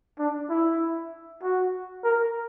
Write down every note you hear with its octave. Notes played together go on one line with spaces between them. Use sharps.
D4
E4
F#4
A#4